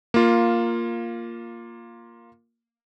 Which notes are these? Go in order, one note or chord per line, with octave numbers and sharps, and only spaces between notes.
A#3 F4